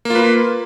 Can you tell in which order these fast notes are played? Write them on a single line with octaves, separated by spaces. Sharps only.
A#3 F4 B4